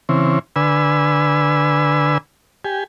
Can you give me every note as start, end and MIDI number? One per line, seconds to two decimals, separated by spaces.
0.09 0.39 49
0.09 0.39 52
0.09 0.39 60
0.56 2.18 50
0.56 2.18 71
0.56 2.18 80
0.56 2.18 88
2.65 2.84 67
2.65 2.84 80